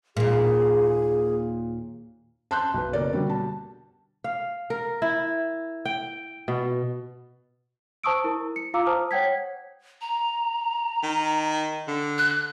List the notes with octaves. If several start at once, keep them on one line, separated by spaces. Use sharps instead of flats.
D#2 A#2 G#4
A5 C6 F#6 G6
B1 B4
F#1 A#4 D5
B2 D3 G3
A5
F5
A#4
E4
G5
B2
C5 A5 C#6 D#6 E6 D7
E4 A#4
C#7
F4 F5 A#5 D6 E6
C5 A5 D#6 F6
C#5 F#5 G5 G#6 B6
A#5
D#3
D3
F#6